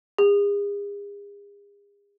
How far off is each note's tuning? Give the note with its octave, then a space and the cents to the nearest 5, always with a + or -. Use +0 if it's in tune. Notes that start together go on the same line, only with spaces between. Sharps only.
G#4 -40